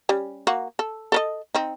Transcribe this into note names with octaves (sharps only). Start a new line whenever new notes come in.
G3 C#4
A#3 F#4
A4
A4 A#4 D#5
C4 D#4